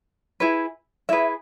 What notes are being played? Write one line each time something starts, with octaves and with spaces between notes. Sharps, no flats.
E4 G#4 B4
E4 G#4 B4 E5